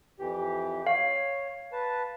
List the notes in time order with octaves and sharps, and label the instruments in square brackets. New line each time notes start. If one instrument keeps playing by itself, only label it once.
[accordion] F2 E3 G4
[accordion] C#5 [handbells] F5
[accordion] B4 A5